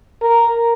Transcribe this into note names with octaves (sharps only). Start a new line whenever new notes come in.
A#4